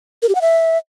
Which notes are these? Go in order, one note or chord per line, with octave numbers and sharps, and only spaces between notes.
A#4
G4
F#5
E5